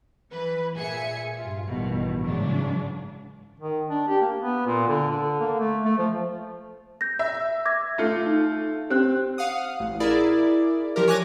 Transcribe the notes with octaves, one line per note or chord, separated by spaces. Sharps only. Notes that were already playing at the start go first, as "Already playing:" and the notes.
E3 B4
A#2 G#4 E5 G#5 C#7
G2 F4
A1 G2 B2 D#3
G#2 C#3 E3 F#3 D4
D#3
D4
G4
A#3
B3
A#2
D3
D3
A#3
A3
A3
F3
G6 A#6
E5
D6 G#6 A#6
A3 F4
D#4
C4 G4 C5 F#6
F5 F#5 D#6
A1
E4 G#4 A#4 D5
F3 G4 A#4
C#5 G#5 D6 F#6 A#6